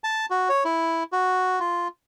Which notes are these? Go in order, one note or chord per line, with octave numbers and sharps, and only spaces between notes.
A5
F#4
C#5
E4
F#4
F4